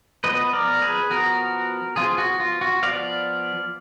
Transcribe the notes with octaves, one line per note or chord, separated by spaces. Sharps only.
F3 B3 B4 D#5
A#4 D5
G#4 B4
F3 B3 F#4 A#4
F3 B3 F4 G#4
F#4
F4
F#4
F3 B3 D5 F5